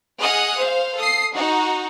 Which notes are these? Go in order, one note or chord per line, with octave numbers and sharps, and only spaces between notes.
G#4 D#5 F#5 D#6 F6 F#6
C5 F5
A4 D#6 C7
D#4 F#4